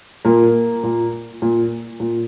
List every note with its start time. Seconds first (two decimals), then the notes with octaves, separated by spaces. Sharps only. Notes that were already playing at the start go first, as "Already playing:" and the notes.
0.25 A#2 A#3
0.83 A#2
1.42 A#2
2.00 A#2